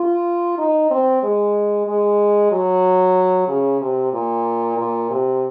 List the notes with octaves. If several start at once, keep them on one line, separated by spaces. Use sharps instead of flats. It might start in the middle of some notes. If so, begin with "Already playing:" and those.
Already playing: F4
D#4
C4
G#3
G#3
F#3
C#3
C3
A#2
A#2
C3